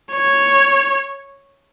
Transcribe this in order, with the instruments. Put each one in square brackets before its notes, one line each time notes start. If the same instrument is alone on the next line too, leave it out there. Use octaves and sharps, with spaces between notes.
[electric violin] C#5